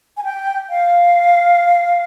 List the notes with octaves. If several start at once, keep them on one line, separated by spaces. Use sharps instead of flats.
G#5
G5
F5